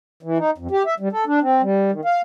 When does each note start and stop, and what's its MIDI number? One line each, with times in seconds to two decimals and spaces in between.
0.23 0.38 52
0.38 0.51 63
0.58 0.67 41
0.71 0.83 67
0.86 0.94 76
1.00 1.09 55
1.12 1.25 69
1.26 1.40 62
1.42 1.62 60
1.62 1.91 55
1.91 2.01 51
2.05 2.21 77